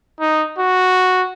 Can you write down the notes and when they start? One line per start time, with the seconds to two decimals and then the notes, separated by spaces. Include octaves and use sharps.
0.20 D#4
0.59 F#4